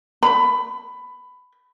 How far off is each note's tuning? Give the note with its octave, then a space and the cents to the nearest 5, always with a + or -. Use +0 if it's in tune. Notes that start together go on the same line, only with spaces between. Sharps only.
B5 +15